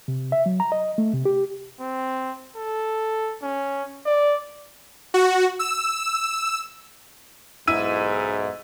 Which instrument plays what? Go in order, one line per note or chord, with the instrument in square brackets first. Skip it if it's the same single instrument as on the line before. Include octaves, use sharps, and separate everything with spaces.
[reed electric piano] C3
E5
F#3
A#5
D#5
A3
C3
G4
[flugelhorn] C4
A4
C#4
D5
[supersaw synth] F#4
E6
[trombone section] B1 G#2 [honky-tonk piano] E4 E6 D#7